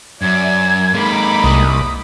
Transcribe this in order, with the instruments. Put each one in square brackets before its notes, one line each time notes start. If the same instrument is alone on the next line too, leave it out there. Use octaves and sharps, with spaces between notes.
[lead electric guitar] F#2 [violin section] D5 E5 [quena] G#6
[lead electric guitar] G#3 A#3 [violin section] D#4 B5 D6
[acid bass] C2 [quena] D#6